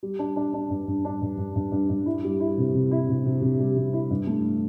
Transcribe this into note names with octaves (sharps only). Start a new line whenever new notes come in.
G3
D4
D4
D4
G2
G2
D4
G2
G2
G2
G2
G2
E4
G3
E4
C3
C3
E4
C3
C3
C3
G3
C3
E4
G2
A3